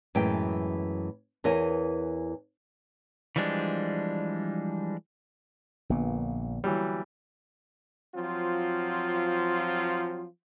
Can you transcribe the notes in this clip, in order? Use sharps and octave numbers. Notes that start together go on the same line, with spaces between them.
F#2 A2 E3 G#3 G5
E2 E3 A#4 C#5 G#5
E3 F3 G3 G#3 D4
A#1 A#2 D3 A#3 B3
E3 F#3 G3
F3 F#3 C4 F4